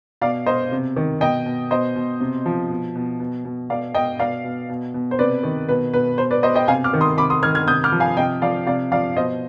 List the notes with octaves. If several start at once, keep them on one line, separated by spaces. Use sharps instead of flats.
B2 D5 F5
B2 C5 D#5
C3
D#3
B2 D#5 G5
B2
B2 C5 D#5
B2
C3
F3
B2
B2
B2
B2
B2 D5 F5
B2 D#5 G5
B2 D5 F5
B2
B2
B2
C5
C3 B4 D5
D#3
B2 B4
B2 B4
B2 C5
B4 D5
B2 C5 D#5
D#5 G5
C3 F5 G#5
D6 F6
D#3
C6 D#6
C3 B5 D6
C6 D#6
D#3 F6 G#6
F6 G#6
C3 D#6 G6
D6 F6
F3
F5 G#5
C3 D#5 G5
F3 D5 F5
C3 D5 F5
F3 D5 F5
B2 C5 D#5